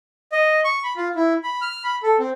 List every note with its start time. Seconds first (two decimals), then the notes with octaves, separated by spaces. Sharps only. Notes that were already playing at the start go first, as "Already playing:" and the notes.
0.32 D#5
0.64 C#6
0.84 B5
0.96 F4
1.16 E4
1.43 B5
1.62 F6
1.84 B5
2.03 A4
2.19 C4